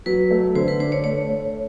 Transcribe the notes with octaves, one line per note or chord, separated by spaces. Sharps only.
F#3 B4
A3
D3 C5
B4
D4 C5
C#5
A3 C#5
A3